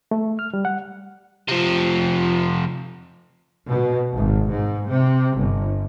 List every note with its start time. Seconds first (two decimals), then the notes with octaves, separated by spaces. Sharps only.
0.11 A3
0.39 F6
0.54 G3
0.65 F#5
1.49 C3 F3
3.68 B2
4.14 G#1
4.50 G#2
4.89 C3
5.37 G1